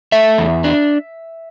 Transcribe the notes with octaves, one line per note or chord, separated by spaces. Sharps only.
A3 E5
E2
D4